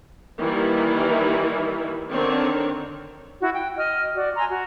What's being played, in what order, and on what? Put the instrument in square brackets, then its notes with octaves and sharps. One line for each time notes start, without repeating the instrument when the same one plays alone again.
[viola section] D#3 E3 G3 A#3 D#4 E4
D3 D#3 C4 D4 C#5
[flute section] E4 F#4
G5
D#5 F6
F#4 D5
G#5 A#5 C6 E6
F#4